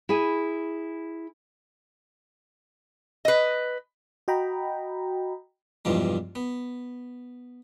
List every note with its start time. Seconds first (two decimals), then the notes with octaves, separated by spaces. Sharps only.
0.09 E4 G#4 G#5
3.25 B4 D#5
4.28 F#4 D#5 G5 A#5 B5
5.85 B1 E2 G2 C3 F3 G#3
6.35 B3